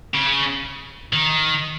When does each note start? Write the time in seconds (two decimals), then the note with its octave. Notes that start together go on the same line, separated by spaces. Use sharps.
0.14 C#3
1.13 D#3